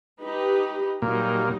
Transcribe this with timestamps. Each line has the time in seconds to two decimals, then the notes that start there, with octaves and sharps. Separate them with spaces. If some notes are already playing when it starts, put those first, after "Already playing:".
0.21 D#4 G4 B4
1.02 A#2 F#3 G3 D#4